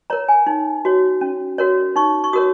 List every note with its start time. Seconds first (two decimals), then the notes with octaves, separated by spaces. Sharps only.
0.10 A#4 C#5 A#5
0.28 G#5
0.47 D#4
0.85 F#4 C#5
1.21 C#4
1.58 F#4 A#4 C#5
1.96 D#4 C#6
2.24 C#6
2.33 F#4 A#4 C#5 D#6